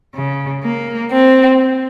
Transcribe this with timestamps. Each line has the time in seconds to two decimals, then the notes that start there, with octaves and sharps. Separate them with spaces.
0.15 C#3
0.63 A#3
1.12 C4